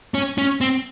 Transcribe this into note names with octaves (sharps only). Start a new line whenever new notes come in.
C#4
C#4
C4